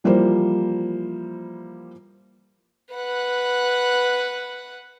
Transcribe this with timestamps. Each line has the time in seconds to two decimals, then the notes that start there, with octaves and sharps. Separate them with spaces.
0.04 E3 F3 G3 A#3 E4 C5
2.93 B4 F#5